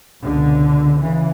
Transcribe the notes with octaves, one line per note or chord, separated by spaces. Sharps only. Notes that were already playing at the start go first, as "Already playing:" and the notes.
C#2 B2 D3
C#3 E3